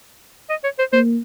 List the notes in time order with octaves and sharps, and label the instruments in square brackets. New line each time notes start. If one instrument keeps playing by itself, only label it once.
[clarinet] D#5
C#5
C5
[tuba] A#3 [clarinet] C5